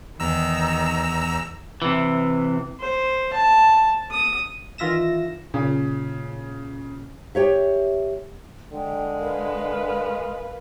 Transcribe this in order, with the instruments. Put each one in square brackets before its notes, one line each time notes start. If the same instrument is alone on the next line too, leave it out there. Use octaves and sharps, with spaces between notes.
[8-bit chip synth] E2 A#5 E6 [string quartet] D#3
[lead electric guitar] C3 E3
[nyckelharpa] C5
A5
D#6
[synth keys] D#3 E3 F4 E5 A#6 E7
[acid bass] A#2 [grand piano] C#3
[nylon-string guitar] G4 C#5 E5
[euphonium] D3 [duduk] G#3 [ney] G5
[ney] A#4 [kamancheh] B4 F5